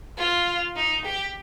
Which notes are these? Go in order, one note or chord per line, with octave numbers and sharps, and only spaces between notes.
F4
D#4
G4